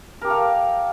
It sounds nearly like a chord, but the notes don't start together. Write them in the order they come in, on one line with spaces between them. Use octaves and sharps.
A#4 G4 A4 F5